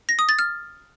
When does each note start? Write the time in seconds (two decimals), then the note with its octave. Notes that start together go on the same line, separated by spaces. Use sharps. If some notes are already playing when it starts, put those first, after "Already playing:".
0.09 A#6
0.19 D#6
0.29 A6
0.39 F6